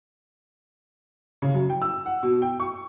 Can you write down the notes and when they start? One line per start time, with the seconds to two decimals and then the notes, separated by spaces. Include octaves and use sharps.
1.42 C#3
1.54 F#2
1.70 G5
1.82 E6
2.06 F#5
2.23 B2
2.42 G5
2.60 C#6